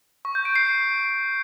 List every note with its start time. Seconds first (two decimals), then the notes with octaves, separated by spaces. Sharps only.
0.25 C#6
0.35 G6
0.45 D7
0.56 C7